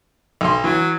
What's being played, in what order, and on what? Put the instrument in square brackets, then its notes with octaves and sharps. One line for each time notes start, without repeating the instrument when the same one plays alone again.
[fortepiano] B1 C6
[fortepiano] E3 [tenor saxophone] F#3